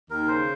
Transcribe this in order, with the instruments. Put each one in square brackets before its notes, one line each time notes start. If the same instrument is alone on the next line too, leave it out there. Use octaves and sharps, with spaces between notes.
[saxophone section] D#2 [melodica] A#4
[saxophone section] C#3 [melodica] C5